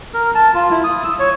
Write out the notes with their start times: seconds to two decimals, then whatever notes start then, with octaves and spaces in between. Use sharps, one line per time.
0.14 A#4
0.35 A5
0.54 F4
0.71 E4
0.84 D#6
1.04 E6
1.19 C#5